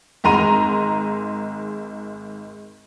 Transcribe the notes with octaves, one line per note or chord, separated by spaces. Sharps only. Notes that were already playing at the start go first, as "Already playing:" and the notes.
G#1 G#3 A#5 C6 D#7